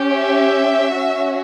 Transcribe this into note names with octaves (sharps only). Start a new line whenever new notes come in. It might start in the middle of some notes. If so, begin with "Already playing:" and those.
Already playing: C#4 G4
E5
C#4 F#4